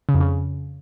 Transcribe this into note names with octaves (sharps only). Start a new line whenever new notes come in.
C#3
F2
C#3